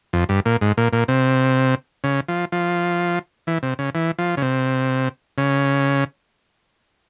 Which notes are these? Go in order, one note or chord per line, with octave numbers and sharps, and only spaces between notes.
F2
G2
A#2
G#2
A#2
A#2
C3
C#3
F3
F3
E3
C3
C#3
E3
F3
C#3
C3
C#3